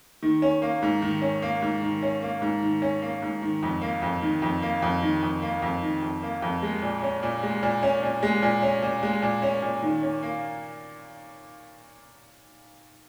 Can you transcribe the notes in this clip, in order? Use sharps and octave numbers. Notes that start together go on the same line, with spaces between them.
D#3
C#4
A#3
G#2
D#3
C#4
A#3
G#2
D#3
C#4
A#3
G#2
D#3
C#4
A#3
G#2
D#3
F2
A#3
F2
D#3
F2
A#3
F2
D#3
F2
A#3
F2
D#3
F2
A#3
F2
G#3
A#2
C#4
A#2
G#3
A#2
C#4
A#2
G#3
A#2
C#4
A#2
G#3
A#2
C#4
A#2
D#3
C#4
A#3